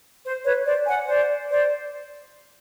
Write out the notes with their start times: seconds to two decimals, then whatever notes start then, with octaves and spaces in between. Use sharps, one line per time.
0.25 C5
0.45 B4 C#5
0.65 C5 D5
0.86 F#5 G#5
1.07 C5 D5
1.49 C5 D5